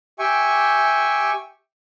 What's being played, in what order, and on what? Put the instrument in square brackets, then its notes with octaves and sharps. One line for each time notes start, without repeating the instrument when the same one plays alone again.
[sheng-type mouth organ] G4 E5 G5 G#5 C#6